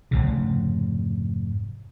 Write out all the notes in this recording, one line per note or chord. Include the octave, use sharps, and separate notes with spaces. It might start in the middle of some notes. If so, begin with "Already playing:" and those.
F1 A#1 G#2 C#3